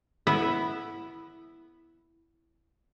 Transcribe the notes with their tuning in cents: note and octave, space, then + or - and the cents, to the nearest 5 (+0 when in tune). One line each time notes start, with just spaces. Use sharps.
B3 -5 E4 +0